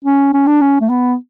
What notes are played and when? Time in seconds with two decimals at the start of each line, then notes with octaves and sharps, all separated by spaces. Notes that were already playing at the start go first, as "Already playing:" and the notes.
0.05 C#4
0.33 C#4
0.47 D4
0.61 C#4
0.81 A3
0.89 B3